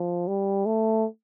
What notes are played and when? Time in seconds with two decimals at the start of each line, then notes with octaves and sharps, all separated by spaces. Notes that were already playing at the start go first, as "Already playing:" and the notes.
Already playing: F3
0.28 G3
0.66 A3